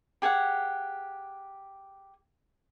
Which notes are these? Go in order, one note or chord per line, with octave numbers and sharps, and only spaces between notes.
G4 G#4 F5 F#5